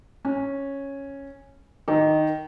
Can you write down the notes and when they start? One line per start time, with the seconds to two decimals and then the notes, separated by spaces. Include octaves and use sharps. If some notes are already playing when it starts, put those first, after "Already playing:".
0.25 C#4
1.88 D#3